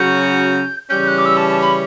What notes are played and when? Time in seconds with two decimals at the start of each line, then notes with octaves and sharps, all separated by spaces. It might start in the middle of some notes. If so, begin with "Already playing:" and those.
Already playing: C#3 F#3 C#4 F#4 G6
0.90 C#3 E3 G3 C#4 G6
1.08 F#6
1.18 D6
1.25 E6
1.37 A5
1.49 A5
1.61 B5